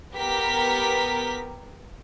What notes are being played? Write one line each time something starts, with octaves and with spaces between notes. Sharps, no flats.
B3 G4 A#4 B6